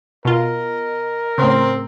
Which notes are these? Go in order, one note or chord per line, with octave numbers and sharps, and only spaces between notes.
B2 F4 A#4 D#5
A2 C#3 C4 C6